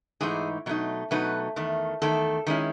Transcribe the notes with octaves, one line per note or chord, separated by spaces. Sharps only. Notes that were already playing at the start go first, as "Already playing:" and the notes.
G#2 E3 A3 D#4 G#4
B2 F#3 A3 D#4
B2 F#3 A3 D#4 B4
E2 D#3 A3
E2 D#3 A3 A4
D#3 G#3 C#4 E4